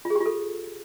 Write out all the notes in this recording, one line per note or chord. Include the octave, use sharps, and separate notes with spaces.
F4
G#4
G4
F4
A4